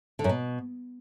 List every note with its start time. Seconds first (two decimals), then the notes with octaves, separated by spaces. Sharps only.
0.19 D3
0.24 F#2
0.29 B2